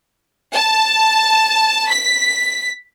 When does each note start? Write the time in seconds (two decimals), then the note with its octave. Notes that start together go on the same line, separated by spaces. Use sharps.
0.55 A5
1.90 B6